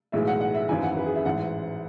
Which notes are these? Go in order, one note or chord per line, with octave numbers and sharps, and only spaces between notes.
B1 A2 E3 G#3 E5
F#5
F#5
E5
G#1 F#2 E3 G#5
F#5
B4
G#4
E5
A1 G#2 E3 F#5